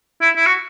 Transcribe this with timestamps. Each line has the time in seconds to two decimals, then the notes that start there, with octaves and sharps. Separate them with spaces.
0.22 E4
0.37 E4
0.46 F#4